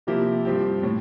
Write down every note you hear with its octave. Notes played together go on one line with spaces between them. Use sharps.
C3 F3 A#3 E4 G4
G2 F3 C4 G4
A2